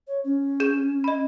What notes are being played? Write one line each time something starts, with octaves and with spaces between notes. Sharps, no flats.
C#5
C#4
G#4 G6 E7
D#5 B5